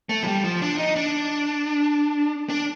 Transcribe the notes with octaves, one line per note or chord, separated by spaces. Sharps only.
A3
F3
G3
F3
D4
D#4
D4
D4